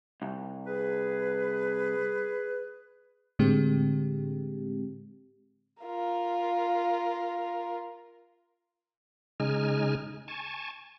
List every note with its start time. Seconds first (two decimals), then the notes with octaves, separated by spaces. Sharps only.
0.22 C2
0.66 G#4 B4
3.39 A2 D3 G#3 C4 G4
5.83 F4 A#4
9.40 C#3 G#3 D#4 G#5 F6
10.28 G#5 A5 C#6